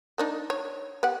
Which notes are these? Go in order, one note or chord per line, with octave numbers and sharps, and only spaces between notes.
A#3 D4 D#4
C#5
B3 G4 F#5